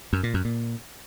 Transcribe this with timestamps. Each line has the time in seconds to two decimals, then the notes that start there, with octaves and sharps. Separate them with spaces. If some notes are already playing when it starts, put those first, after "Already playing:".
0.13 F#2
0.23 A#2
0.34 F#2
0.45 A#2